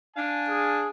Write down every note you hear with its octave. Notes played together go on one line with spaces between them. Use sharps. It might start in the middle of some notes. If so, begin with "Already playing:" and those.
D4 F5 G#5
G#4